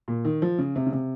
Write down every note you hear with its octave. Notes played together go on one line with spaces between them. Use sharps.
A#2
D#3
F3
C#3
C3
C#3
C3